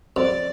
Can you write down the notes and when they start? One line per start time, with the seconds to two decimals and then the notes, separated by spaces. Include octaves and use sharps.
0.16 F2 D5